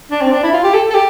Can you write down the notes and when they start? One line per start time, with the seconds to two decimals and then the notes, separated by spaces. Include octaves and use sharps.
0.11 D4
0.22 C4
0.32 D4
0.43 E4
0.53 F4
0.64 G4
0.74 A4
0.90 A4
0.94 G4